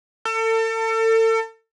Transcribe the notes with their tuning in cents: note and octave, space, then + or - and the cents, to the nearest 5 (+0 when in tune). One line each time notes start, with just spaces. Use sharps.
A4 +35